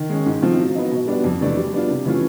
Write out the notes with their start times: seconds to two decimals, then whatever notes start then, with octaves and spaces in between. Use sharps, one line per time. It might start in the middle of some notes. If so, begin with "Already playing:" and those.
Already playing: D#3
0.09 G#3 C#4
0.26 G#2
0.42 F3 A3 C4 F4
0.59 F#3
0.75 B3 D#4
0.91 B2
1.08 G3 B3 D4
1.24 F2
1.40 C3 E3 A3 D4
1.57 G3
1.73 B3 D4 F4
1.90 C3
2.06 E3 A3 C#4 F4